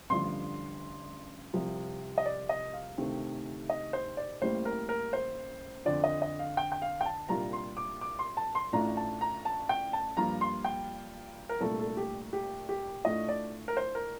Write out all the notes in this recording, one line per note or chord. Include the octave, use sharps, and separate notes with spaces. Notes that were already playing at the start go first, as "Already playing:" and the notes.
A1 G2 D3 F3 C6
C2 C3 F3
D#5
D5
D#5
F5
D2 C3 D#3 A3 C4
D#5
C5
D5
A1 A2 G3 A#3 C5
A#4
A#4
C5
F2 D3 F3 D5
D#5
D#5
F5
G5
G5
F5
G5
A5
C2 A#2 G3 D4 F4 A#5
C6
D6
D6
C6
A5
C6
A1 A2 A3 D4 F4 A#5
A5
A#5
A5
G5
A5
G2 F3 A#3 F4 A#5
C6
G5
A#4
C2 A#2 A3 D4 F4 A4
A4
G4
G4
G4
A2 A3 D4 F4 D#5
D5
A#4
C5
A#4